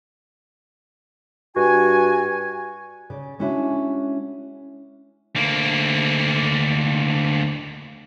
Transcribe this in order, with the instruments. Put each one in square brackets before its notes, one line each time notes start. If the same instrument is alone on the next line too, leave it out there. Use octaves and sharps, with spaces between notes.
[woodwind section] G2 F#4 G#5
[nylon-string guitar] C#3 D5
G#3 C#4 D4 E4 F#4
[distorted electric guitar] D2 A#3